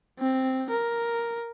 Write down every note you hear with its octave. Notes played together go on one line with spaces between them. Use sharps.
C4
A#4